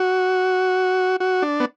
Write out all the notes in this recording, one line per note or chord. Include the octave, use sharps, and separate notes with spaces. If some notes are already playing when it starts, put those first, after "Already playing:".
Already playing: F#4
F#4
D4
B3